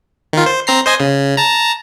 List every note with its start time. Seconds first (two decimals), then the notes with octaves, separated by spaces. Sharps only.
0.33 D#3 F4
0.46 C5
0.67 C4 A#5 C7
0.86 C5 D#5 G#5
1.00 C#3
1.37 A5 A#5